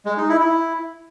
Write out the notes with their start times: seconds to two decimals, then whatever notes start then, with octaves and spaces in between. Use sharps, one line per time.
0.05 G#3
0.17 D#4
0.29 E4
0.41 E4